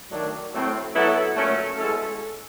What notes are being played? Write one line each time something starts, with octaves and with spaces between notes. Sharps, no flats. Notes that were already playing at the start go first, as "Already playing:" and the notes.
D#3 F#3 A3 D4
A2 F#3 A3 C4
F#3 B3 E4 A4
A#2 F#3 A3 C#4
B2 G#3 C#4 E4 A4